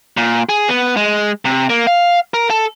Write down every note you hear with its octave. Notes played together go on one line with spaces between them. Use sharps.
A#2
G#4
B3
G#3
C3
A#3
F5
A#4
A4